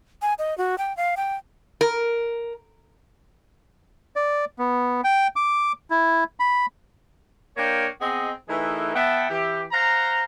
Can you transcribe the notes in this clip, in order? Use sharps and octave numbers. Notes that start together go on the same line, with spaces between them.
G#5
D#5
F#4
G5
F5
G5
A#4
D5
B3
G5
D6
E4
B5
A#3 D4 A#4 C#5 G5
B3 C4 G#4 D#5
E3 A3 D#4 G#4 A#4 B4
B3 E5 F#5 G5 A5 B5
E3 G4
C5 F5 F#5 A#5